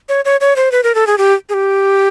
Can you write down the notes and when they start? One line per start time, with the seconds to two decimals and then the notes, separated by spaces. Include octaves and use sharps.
0.09 C#5
0.25 C#5
0.41 C#5
0.56 C5
0.72 B4
0.83 A#4
0.95 A4
1.07 G#4
1.18 G4
1.49 G#4
1.54 G4